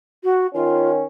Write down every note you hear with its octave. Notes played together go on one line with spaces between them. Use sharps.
F#4
D#3 C#4 F4